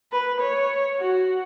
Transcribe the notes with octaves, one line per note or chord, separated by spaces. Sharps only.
B4
C#5
F#4